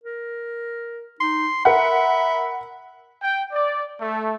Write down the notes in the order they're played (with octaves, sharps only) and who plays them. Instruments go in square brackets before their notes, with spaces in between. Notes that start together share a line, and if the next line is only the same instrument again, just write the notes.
[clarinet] A#4
[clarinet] D#4 [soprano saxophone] C6
[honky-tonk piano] A#4 F#5 [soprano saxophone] E5 [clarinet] B5
[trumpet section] G5
D5
A3